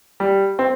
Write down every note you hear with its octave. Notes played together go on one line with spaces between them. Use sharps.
G3
C4